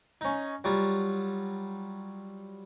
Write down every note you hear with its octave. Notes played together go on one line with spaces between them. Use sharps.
C#4 D#4
F#3 G3 F4